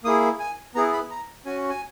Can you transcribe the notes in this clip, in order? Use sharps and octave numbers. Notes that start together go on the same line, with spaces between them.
A#3 E4 G#4 D#6
G#5
B3 E4 G#4 A#5
B5
A#5
C#4 F#4 G#5
G#5